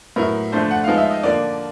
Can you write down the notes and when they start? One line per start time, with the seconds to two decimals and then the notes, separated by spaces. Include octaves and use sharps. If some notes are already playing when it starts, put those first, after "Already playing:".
0.16 A2 F#3 B3 E4 A#4
0.52 D3 F3 A3 D4 C5
0.71 F#5
0.84 F3 G#3 B3 D#4 F5
0.98 E5
1.11 D#5
1.23 D3 F3 A#3 D5